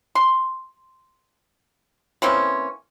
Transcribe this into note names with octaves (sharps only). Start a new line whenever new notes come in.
C6
E3 A#3 C4 C#4